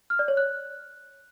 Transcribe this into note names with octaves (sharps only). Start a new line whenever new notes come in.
F6
D5
C#5
F#6